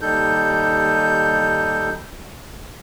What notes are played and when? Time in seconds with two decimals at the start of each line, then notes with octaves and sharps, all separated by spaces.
0.01 D#2 G3 D#4 A4 G6